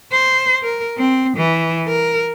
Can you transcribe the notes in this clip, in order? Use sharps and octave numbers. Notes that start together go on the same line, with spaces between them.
C5
A#4
C4
E3
A#4